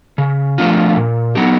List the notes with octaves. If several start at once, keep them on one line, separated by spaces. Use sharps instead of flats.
C#3
F3 A3 D4 F4
A#2
F#3 B3 D#4 G4